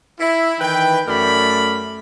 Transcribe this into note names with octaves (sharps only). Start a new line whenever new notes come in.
E4
D#3 E3 B4 G5
F#2 A3 A#4 D5 B5